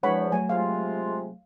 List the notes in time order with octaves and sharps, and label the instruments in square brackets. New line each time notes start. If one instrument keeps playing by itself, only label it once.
[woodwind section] E2 F3 [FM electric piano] G#3 D4 [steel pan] C#5 F#5 B5
[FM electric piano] F#3 A3 [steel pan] G#5
[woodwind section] C3 G#3 F4 [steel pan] F5